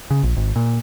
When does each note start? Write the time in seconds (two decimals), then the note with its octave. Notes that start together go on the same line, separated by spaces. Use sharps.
0.11 C#3
0.23 A#1
0.37 G#1
0.56 A#2